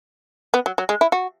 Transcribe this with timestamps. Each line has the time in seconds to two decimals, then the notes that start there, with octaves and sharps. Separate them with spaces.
0.54 B3
0.66 F#3
0.78 F#3
0.89 G#3
1.01 E4
1.12 F#4